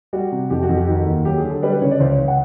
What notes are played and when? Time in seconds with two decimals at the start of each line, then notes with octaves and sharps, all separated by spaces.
0.13 G3 F#4
0.32 C3
0.50 F2 G4
0.63 F#4
0.69 F2
0.75 G4
0.87 D#3 F#4
1.06 D#2
1.25 F#3 G4
1.38 G#4
1.44 D3
1.50 A4
1.62 G3 B4
1.73 B4
1.82 C#3 C#5
1.91 D5
2.00 C#2 C5
2.09 C#5
2.19 C#2
2.28 F#5